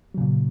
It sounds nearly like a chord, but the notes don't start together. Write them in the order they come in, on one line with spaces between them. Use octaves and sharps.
F#3 C#3 A#2